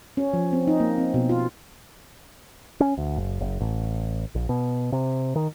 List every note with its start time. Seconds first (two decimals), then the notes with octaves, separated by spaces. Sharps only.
0.17 C#4
0.33 F3
0.53 C4
0.67 D#4
0.80 A#3
0.98 C4
1.14 B2
1.29 F4
2.80 C#4
2.98 D2
3.17 F#1
3.40 F#1
3.60 A1
4.35 A#1
4.49 B2
4.92 C3
5.36 D#3